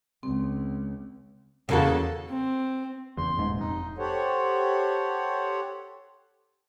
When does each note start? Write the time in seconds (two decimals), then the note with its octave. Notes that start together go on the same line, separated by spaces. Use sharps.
0.23 C#2 C4
1.69 E2 C#3 A#3 F#4 A4 A5
2.29 C4
3.17 F#1 E2 C6
3.37 D#1 G#2
3.60 F1 D#4
3.98 G4 A4 C5 C#5 F#5